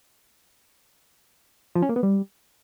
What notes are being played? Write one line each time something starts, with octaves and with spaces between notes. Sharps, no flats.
F3
C#4
A#3
B3
G3